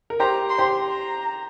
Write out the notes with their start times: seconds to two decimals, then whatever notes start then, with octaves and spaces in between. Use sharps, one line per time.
0.10 A#4
0.19 G4 C5 A#5
0.49 C6
0.58 G4 C5
0.78 A#5